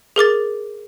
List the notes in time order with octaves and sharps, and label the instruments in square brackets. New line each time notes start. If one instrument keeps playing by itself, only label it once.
[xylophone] G#4 A#4 D6 A6